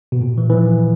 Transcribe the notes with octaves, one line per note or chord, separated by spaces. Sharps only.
B2
A#2
E3
E3
F3